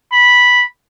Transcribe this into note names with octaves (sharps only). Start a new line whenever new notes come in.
B5